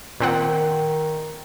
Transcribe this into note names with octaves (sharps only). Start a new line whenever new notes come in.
A#2 D#3 C4 F#5